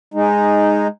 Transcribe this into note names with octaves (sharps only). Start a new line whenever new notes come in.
G#3 D#4